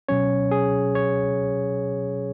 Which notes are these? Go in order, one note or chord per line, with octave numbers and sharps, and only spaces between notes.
B2 F#3 C#4 C#5
G#4
C#5